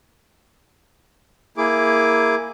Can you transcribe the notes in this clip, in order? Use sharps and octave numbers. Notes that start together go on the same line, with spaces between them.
A#3 E4 G#4 D6